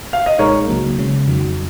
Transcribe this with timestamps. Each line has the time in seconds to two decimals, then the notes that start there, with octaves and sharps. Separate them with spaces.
0.13 F5
0.26 D#5
0.39 B1 A#2 G#3 D#4 G#4 A#4 C#5
0.68 C#2 C#3 F#3 A#3
0.98 C#3 G#3 C#4
1.27 F2 D#3 F#3